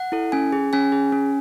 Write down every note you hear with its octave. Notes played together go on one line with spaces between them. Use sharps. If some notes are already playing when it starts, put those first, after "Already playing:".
Already playing: F#5
E4 A4
C#4 G#5
G#4
C#4 G#5
G#4
C#4